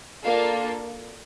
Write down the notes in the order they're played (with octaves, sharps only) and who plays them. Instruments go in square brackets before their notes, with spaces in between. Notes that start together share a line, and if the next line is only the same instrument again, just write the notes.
[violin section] A#3 D4 F4 A4 F5